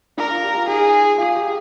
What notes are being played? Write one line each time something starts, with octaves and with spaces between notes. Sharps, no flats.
D4 A#4
F4
G4
F4
D#4 G#4
F4 G#4
G4